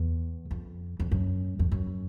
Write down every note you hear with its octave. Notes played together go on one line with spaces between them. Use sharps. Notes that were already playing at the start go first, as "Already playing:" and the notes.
Already playing: E2
F2
F2
F#2
F2
F#2